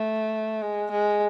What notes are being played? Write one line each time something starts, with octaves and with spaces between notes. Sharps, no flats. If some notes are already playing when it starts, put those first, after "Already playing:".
Already playing: A3
G#3
G#3